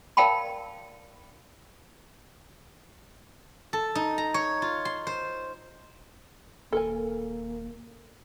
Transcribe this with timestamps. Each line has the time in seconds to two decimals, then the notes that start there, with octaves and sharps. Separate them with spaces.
0.17 A#4 D5 F5 G5 A5 B5
3.73 A4
3.95 D#4
4.18 A#5
4.34 C#5
4.62 F4
4.85 C6
5.07 C5
6.73 D#1 A#3 A4 A#4 G#5